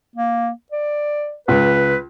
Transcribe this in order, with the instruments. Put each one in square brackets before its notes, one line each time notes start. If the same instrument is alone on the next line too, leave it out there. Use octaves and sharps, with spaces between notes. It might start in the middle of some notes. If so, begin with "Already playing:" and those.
[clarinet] A#3
D5
[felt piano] C#2 [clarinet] B4